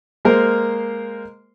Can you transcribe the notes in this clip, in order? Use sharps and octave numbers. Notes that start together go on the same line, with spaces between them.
G#3 A#3 A#4 C5